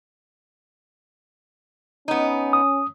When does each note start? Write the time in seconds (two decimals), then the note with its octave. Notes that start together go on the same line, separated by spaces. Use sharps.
2.08 B3 C#4 D#4
2.53 D#6